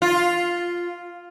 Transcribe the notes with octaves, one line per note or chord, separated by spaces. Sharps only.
F4